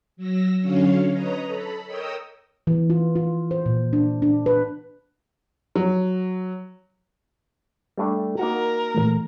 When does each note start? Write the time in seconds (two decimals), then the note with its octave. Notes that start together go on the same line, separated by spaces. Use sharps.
0.17 F#3 E6 A#6
0.61 D3 F#3 C#4 C#5 F5
1.12 B4 C#5 D#5 A#5
1.46 A4 B5
1.86 A#4 C#5 D#5 G5 D#6 E6
2.67 E3
2.90 F4
3.16 F4
3.51 C5
3.66 A#2
3.93 D4
4.22 D4
4.46 B4
5.75 F#3
7.98 G3 A3 D4
8.39 A#3 D#4 F#4 A#4
8.95 A#2 E3 A3